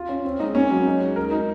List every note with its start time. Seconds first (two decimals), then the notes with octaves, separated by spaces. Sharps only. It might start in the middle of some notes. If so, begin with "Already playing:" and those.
Already playing: F4
0.09 C#4
0.25 C4
0.40 G#3 D#4
0.54 A#3 C#4
0.71 F#3
0.86 D#4
1.01 G#3
1.16 A#4
1.31 D#4